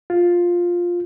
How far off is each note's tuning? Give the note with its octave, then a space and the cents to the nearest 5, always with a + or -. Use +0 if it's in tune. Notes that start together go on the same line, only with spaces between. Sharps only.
F4 +5